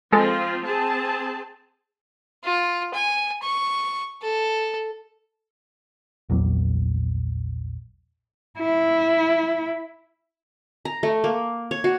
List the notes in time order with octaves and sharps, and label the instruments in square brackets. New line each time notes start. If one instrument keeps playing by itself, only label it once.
[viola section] F3 C4 F4 [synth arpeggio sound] G#3 A4
[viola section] C4 G#4 A5
[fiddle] F4
G#5
C#6
A4
[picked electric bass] A#1 E2 F#3 A#3
[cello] E4
[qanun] A#5
A3
A#3
C#5
F#4